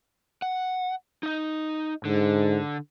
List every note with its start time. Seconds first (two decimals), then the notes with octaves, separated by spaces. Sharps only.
0.42 F#5
1.23 D#4 D#5
2.05 G#2 D3